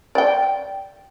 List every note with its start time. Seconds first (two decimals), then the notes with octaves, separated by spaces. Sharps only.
0.15 D5 G5